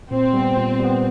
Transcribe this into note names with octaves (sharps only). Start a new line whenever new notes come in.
A#2 C4
G3 B3
A#2
G3 B3